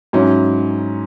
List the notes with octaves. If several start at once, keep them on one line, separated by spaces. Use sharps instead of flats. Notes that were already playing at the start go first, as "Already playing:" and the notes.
G#2 F#3 C#4 E4